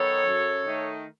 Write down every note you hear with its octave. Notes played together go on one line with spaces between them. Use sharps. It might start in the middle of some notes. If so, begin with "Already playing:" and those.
Already playing: D#3 F#3 B3 D#4 A4 C#5
F#2
D#3 A3 D#4